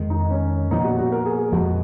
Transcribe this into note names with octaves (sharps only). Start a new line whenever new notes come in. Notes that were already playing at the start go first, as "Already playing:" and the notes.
Already playing: F2 D#3 G#3
D#4
C#4
A#2 F3 B3 D#4
F#4
F#4
A#4
G#4
G#4
F2 F3 G#3 F#4